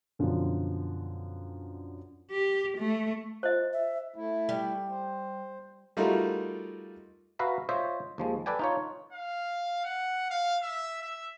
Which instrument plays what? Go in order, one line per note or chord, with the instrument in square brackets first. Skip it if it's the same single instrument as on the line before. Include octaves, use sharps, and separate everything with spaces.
[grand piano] F#2 B2 D3 F3
[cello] G4
A3
[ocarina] F4 [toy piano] C5 D#5
[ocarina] E5
[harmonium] A3 E4
[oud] G3
[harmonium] C5
[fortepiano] G3 A3 D#4 F4 F#4 A#4
[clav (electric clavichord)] F#4 B4 E5 F5 A#5
F4 C5 C#5 D#5 E5
D#2 F3 G#3
A4 B4 D5 G5 G#5
D#4 F4 C#5
[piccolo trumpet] F5
F#5
F5
E5
E5